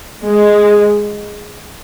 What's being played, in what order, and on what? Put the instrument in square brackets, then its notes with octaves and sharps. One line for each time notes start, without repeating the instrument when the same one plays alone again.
[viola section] G#3